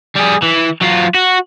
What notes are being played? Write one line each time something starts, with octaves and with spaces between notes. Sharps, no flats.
G3 G#4
E3
F#3 F4
F#4